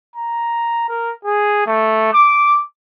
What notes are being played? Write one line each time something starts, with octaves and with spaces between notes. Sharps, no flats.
A#5
A#4
G#4
A3
D6